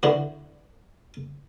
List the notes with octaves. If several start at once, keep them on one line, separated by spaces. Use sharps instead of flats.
D3 E3 F#4